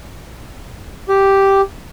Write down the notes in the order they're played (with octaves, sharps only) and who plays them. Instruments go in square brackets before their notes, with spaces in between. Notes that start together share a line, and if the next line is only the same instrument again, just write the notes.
[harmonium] G4